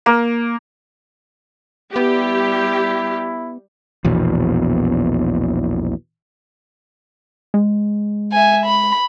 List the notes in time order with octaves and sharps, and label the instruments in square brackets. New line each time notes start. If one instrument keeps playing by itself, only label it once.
[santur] A#3
[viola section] G3 G4 [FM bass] B3 [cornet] E4
[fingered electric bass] A#1 E2 B2
[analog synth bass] G#3
[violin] E5 G#5
B5